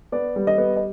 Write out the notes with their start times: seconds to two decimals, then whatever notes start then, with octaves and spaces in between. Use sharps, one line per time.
0.12 B3 D5
0.36 G3
0.47 D#5
0.58 B3
0.76 D#5